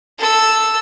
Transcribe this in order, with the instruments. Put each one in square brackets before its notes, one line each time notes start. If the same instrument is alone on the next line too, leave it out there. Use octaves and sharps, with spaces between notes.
[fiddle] A4 E6